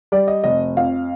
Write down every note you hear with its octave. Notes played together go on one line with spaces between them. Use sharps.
G3 D5
D#5
F1 D#5
F2 F5